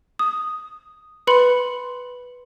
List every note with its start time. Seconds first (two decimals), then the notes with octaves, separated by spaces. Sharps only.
0.19 D#6
1.27 B4 B5 C6 C#7 F#7